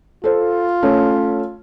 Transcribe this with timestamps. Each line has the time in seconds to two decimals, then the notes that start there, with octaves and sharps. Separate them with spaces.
0.24 F4 A4 C5
0.83 A3 C#4